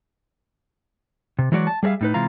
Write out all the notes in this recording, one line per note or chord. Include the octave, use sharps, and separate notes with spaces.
C3
E3 F#3 G#3 F#4 D5
A5
G3 G#4 A#4 E5 F5
A2 D#4 B4
C3 E3 G#3 F4 F5 A#5